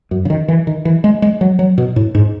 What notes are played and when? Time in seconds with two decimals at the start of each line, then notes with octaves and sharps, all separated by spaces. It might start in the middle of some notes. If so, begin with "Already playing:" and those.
0.11 F#2
0.25 C#3
0.30 D#3
0.48 E3
0.67 D#3
0.85 E3
1.04 G#3
1.22 G#3
1.41 F#3
1.59 F#3
1.78 B2
1.96 A2
2.15 G#2